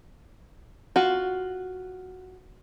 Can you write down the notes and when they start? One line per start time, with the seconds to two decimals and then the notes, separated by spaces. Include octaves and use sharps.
0.96 F4 F#4